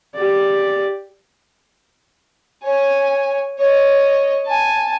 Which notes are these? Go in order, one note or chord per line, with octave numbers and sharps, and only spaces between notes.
G4 D5
C#5 G#5
C#5 D#5
G#5 A5